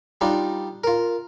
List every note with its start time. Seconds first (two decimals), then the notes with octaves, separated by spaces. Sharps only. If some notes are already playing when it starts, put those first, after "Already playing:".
0.21 G3 D4 D#4 F4
0.84 F4 A#4